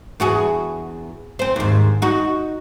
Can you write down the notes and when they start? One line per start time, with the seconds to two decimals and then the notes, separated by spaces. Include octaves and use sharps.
0.20 E2 F#4 G#4
1.39 C4 C5
1.56 D#2 G#2
2.02 D#4 F#4